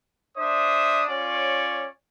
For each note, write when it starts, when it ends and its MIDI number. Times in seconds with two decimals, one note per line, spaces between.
0.38 1.03 62
0.38 1.03 72
0.38 1.03 76
0.38 1.03 87
1.08 1.87 61
1.08 1.87 65
1.08 1.87 73
1.08 1.87 74